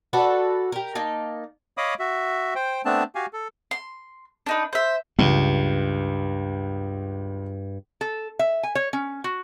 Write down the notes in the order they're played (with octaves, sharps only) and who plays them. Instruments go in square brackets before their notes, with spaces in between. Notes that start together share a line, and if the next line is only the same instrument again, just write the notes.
[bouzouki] F#4 A4 B4 D5
G4 A#4
A#3 D#4 A5
[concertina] C#5 D#5 F5 B5 D6 D#6
F#4 E5
C5 G5
A3 B3 C4 D4 A5
F#4 G4 F5 G#5
A4
[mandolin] C6
D4 D#4 B4
C5 E5
[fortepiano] C#2 [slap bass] G2
[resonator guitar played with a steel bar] A4
E5
G#5
C#5
C#4
F#4